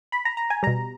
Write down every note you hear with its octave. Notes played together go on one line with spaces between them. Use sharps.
B5
A#5
A#5
G#5
B2 G3 A#5